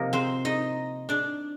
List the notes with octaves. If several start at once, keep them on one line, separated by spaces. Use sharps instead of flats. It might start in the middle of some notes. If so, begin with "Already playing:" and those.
Already playing: C3 F3 A#3 D#4 A#4
C4 C5
D#4 D#5
D4 D5